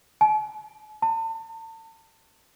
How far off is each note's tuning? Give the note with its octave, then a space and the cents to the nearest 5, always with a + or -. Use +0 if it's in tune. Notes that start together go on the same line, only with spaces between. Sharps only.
A5 -45
A5 +40